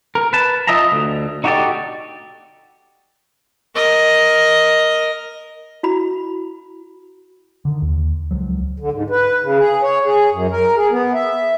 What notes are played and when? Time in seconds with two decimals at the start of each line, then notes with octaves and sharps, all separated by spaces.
0.15 A#4
0.33 B4 A5
0.67 F4 D#5 E5 A5 A#5
0.92 D2
1.44 D#4 F#4 G4 A4 D5
3.75 A#4 D#5
5.83 E4 F#4 B5
7.65 D3 D#3
7.82 D#2
8.31 C#2 F3 F#3
8.80 D3
8.92 G#2
9.10 B4
9.41 C#3
9.58 G#4
9.82 C#5
10.04 G#4
10.31 F#2
10.51 A#4
10.76 G#4
10.91 B3
11.14 E5